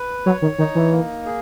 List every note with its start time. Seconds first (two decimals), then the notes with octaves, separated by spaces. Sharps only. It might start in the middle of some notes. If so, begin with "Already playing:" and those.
Already playing: B4
0.26 F#3 C#5
0.42 D#3
0.58 D#3 D#4
0.75 E3
0.92 A#3
1.26 G#4